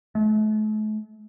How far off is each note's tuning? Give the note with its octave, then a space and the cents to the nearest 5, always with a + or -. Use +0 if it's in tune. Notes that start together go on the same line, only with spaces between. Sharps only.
A3 -40